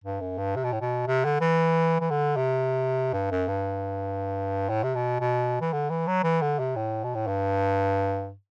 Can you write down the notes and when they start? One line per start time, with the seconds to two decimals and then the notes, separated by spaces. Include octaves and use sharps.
0.04 G2
0.20 F#2
0.38 G2
0.56 C3
0.64 B2
0.72 A2
0.81 B2
1.07 C3
1.25 D3
1.41 E3
2.01 E3
2.10 D3
2.37 C3
3.13 G2
3.31 F#2
3.48 G2
4.69 A2
4.83 C3
4.95 B2
5.20 B2
5.61 E3
5.73 D3
5.90 E3
6.07 F#3
6.23 E3
6.42 D3
6.59 C3
6.76 A2
7.04 B2
7.15 A2
7.27 G2